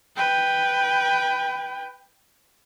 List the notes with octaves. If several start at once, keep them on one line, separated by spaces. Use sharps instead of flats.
B4 G5